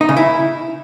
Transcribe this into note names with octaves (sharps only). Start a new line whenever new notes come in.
D#4
C#3
E4